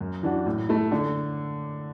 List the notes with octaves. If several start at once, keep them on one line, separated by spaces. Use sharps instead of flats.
F#2
E3 D4 F#4
A2
A3 E4
D3